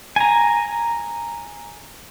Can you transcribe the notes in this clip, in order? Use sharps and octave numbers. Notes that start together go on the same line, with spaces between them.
G#5 A#5